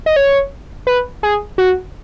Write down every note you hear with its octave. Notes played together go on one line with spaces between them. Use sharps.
D#5
C#5
B4
G#4
F#4